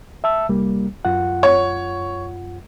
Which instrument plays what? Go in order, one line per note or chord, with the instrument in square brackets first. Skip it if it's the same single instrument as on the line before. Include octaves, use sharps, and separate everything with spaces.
[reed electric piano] E5 A5 E6
C2 G3 A#3
F#2 F4 F#5
[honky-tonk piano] C#5